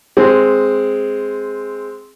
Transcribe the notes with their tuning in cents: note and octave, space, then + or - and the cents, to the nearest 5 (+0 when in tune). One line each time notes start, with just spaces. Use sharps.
G#3 +0 C4 +0